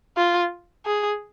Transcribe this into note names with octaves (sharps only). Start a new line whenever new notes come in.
F4
G#4